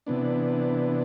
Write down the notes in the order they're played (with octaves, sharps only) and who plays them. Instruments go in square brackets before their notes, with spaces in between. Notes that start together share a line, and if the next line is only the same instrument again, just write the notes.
[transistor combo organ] C3 E3 B3 D4